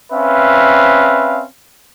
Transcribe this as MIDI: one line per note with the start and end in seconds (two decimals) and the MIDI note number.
0.11 1.44 60
0.11 1.44 61
0.11 1.44 71
0.11 1.44 76
0.11 1.44 77